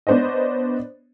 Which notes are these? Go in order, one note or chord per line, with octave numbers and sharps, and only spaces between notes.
B3 D4 C5 C#5 D#5